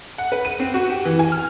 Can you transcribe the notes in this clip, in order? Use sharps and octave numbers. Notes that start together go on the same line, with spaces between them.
F#5
B4
D#7
C4
F#4
G4
E3
G#5
F6